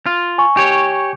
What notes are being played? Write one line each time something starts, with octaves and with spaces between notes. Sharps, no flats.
F4
G#5 C#6
G4 C#5